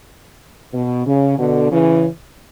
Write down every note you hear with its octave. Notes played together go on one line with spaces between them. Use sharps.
B2
C#3
B2 D3
C#3 E3